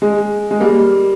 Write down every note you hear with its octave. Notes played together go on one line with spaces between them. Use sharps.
G#3
G#3
G3 A#3